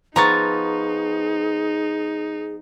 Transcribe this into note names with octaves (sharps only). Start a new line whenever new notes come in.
F3 B3 D#4 G#4 A#5 C#6 A6